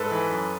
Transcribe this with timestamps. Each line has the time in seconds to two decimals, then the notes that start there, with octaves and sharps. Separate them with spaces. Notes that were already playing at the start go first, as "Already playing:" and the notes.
Already playing: G#2 A4 B4
0.11 E3
0.30 F#2